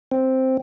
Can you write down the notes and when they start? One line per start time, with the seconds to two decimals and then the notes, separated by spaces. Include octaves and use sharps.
0.11 C4